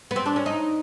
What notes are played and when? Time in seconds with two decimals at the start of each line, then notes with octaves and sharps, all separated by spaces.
0.11 B3
0.16 C4
0.26 D4
0.36 C#4
0.46 D#4